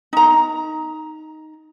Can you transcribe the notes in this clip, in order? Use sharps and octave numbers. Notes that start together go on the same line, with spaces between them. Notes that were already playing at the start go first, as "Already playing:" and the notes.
D#4 A#5